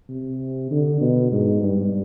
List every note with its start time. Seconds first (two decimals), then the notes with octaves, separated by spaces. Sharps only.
0.09 C3
0.71 D3
1.01 B2
1.32 G#2
1.63 G2